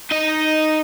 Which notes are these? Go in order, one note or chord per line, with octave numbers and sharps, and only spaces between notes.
D#4 D#5